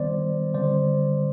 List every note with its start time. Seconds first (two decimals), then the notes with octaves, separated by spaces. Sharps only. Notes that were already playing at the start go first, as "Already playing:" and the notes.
Already playing: D#3 G3 B3 C5 D5
0.54 D3 G3 C4 C5 D5